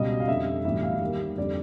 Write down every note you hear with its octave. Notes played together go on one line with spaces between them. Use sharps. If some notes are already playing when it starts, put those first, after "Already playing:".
Already playing: C#2 B2 G3 D#5
F5
F2 D3 G3 E5
B1 A2 E3 G3 E5
F5
D#2 D#3 G3
F2 D3 G3 D5